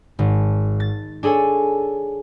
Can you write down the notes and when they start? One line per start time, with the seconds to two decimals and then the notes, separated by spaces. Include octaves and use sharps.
0.19 G#1
0.80 A6
1.23 D4 G#4 A4 C#5 G#5